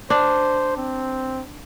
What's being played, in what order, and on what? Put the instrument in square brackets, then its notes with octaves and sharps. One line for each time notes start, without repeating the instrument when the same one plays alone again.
[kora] D4 [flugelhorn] C5
[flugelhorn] C4